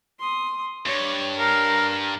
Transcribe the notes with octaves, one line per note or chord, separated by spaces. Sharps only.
C6 D#6
G2 C#5
A#4 F5